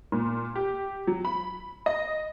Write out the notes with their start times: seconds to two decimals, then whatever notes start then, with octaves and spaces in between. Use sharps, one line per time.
0.12 A#2
0.56 G4
1.07 F#3
1.25 B5
1.86 D#5